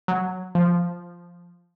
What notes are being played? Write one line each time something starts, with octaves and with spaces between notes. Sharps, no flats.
F#3
F3